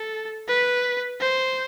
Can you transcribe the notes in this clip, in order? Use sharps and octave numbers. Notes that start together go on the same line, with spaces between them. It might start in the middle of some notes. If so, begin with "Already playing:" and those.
Already playing: A4
B4
C5